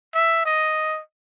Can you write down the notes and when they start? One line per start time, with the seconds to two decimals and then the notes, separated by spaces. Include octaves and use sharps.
0.15 E5
0.45 D#5